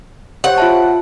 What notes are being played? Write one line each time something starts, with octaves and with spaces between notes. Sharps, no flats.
G4 C5 C#5 F#5
F4 E5 A5